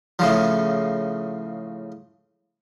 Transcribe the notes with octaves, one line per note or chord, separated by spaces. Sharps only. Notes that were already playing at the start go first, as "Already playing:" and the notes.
A2 C#3 F3